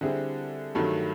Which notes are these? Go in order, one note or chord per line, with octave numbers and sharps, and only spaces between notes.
D3 G3 C4 E4 G#4
G2 D#3 F#3 A3